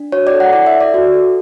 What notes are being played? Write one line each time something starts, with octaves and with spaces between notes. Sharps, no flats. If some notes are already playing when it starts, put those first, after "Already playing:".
Already playing: D4
F#4 C#5
D5
A4
F#5
E4 D5
E5
A4
D5
F#4
A4